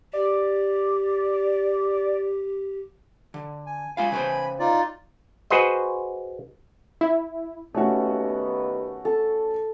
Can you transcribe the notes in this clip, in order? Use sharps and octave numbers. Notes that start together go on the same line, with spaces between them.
G4 D5
D3
G#5
G#3 F4 F5 G#5 B5
C#3 B4 C5
D#4 F4 D5
F#4 G#4 B4 C5 D#5
E4
D#2 A3 B3 C#4 F#4
A4